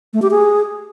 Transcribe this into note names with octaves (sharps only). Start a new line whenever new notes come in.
A3
G4
G#4